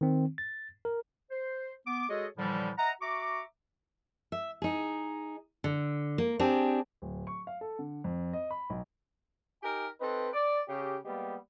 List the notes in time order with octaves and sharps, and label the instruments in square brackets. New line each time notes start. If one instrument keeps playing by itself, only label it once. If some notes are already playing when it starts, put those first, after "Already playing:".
[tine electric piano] D#3 C4
A6
A#4
[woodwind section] C5
B3 D6
G#3 F#4 G#4 A4 C#5 D#5
A2 D3 E3 F3 G3
D#5 E5 F#5 A#5
F#4 E5 A#5 C#6 D6
[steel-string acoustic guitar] E5
D#4 G#4
D3
A#3
C4 D4 G4 G#4
[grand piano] D1
C#6
F5
A4
D3
F2
D#5
B5
B1
[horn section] D#4 G4 A#4 G#5
C4 D#4 A4 B4
D5
C#3 G4
G3 G#3 A#3 B3 G4